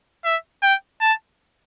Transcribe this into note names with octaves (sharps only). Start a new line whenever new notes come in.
E5
G5
A5